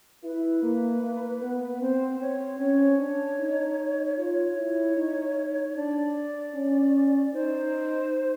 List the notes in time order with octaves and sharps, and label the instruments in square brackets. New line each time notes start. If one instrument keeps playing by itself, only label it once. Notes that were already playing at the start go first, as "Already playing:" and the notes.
[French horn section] E4 [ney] B4
[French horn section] A#3
A#3
B3
[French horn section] C4 [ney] C5
[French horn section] C4 [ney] C#5
[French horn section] C#4 [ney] C#5
[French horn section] D4
D#4
[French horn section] F4 [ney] C#5
[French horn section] E4
D#4
[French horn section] D4 [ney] D5
[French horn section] C#4
[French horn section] D#4 [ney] C5